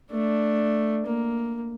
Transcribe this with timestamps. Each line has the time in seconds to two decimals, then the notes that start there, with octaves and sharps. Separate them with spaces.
0.12 A3 D4
1.06 A#3